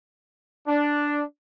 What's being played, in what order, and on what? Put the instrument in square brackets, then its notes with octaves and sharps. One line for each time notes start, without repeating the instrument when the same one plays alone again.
[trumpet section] D4